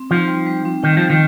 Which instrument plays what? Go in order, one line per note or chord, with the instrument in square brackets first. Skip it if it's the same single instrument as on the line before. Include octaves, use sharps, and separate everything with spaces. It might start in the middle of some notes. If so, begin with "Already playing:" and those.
Already playing: [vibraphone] C4
[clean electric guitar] F3 [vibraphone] D#4
[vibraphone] G3
G3
C4
[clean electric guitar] D#3 [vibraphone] D#4
[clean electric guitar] F3 [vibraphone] G3
[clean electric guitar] D#3